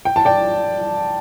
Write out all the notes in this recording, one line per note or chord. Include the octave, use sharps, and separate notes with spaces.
G5
A5
D5 G5